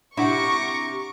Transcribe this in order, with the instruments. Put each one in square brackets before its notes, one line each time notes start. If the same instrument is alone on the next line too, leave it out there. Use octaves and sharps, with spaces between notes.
[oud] C3 E4 [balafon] D4 F#5 [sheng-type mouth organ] A#5 D6 [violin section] C#6